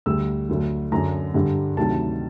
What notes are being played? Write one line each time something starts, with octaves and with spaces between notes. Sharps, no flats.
D2 D3 G3 E6
D2 D3 F#3
F#2 D3 F#3 A#5
G2 D3 G3
D2 C3 D#3 F#3 A5